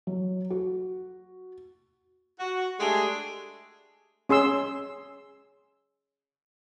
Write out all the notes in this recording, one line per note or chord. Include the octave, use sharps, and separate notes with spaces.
F#3
F#4
F#4
G#3 A3 D4 G4 G#4
C#4 G#4 C6 E6